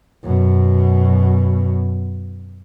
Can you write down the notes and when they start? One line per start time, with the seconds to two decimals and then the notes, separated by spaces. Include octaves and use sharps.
0.23 F#2 B2